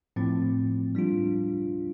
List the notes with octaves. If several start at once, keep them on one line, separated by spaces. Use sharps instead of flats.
A2 F3 C4
G3 D4 F4